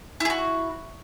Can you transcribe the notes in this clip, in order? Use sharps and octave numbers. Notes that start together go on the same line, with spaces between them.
E4 F#4 G#4